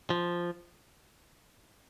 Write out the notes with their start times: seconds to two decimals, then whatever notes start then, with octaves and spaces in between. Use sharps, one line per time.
0.10 F3